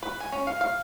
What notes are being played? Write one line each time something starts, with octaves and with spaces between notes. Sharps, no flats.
B4
G#5
C#4
F5
F5